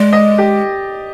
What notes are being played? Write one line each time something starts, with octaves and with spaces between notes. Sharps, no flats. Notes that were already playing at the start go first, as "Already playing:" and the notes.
Already playing: G#3 D5
D#5
G4